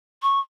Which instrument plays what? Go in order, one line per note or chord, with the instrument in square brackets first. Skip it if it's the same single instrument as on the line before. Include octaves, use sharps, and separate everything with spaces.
[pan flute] C#6